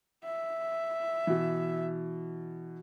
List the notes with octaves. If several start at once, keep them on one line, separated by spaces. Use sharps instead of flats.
E5
B2 E3